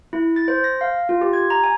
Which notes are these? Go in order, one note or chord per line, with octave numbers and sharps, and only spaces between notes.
E4
A6
C5
A#6
F5
F4
G4
G#6
A#5
G#5